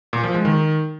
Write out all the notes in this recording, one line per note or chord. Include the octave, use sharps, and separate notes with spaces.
A#2
F3
G#3
D#3